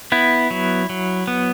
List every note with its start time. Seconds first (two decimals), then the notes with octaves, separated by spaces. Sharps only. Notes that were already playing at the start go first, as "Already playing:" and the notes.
0.12 B3 E4
0.51 F#3
0.89 F#3
1.27 B3